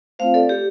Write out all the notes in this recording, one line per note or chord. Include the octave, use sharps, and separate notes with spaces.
A3 C4 F4 C5 F5
A4 D5
G4